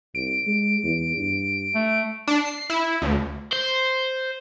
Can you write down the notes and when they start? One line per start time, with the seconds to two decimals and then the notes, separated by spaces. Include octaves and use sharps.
0.15 C2 D7
0.47 G#3
0.83 E2
1.17 G2
1.75 A3
2.28 D4
2.41 C7
2.70 E4
3.02 D2
3.52 C5